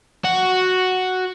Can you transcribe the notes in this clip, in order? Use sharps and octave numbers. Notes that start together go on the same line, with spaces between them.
F#4